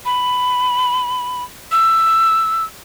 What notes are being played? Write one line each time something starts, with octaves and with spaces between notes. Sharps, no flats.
B5
E6